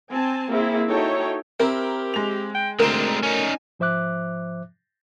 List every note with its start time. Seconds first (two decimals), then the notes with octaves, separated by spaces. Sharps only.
0.12 C4 G#5 A5
0.51 A#3 C4 E4 G#4
0.89 D#4 E4 F#4 A4 C#5 G5
1.60 C4 E4 G4 A#4
2.14 G#3 F7
2.55 G5
2.79 D2 D3 G#3 C4 A#4 C6 E7
3.23 C#4 D#4 G#5
3.79 G#2 F3 C5 E5 D6 F#6